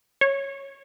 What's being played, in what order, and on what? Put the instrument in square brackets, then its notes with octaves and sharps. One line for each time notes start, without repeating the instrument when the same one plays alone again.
[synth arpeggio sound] C#5